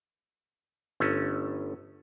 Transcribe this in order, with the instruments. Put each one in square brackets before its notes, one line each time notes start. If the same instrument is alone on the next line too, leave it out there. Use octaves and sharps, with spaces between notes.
[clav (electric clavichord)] G1 A3 C#4